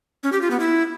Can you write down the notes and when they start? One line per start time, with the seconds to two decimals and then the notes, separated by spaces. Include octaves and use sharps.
0.23 C#4
0.32 G4
0.42 F4
0.51 B3
0.60 E4